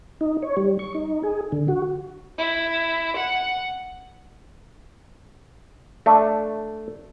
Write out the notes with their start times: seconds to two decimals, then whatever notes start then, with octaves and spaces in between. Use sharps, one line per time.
0.21 D#4
0.43 C#5
0.57 G3
0.79 C#6
0.95 D#4
1.23 G#4
1.52 D3
1.68 F#4
2.38 E4
3.16 F#5
6.06 A3 D4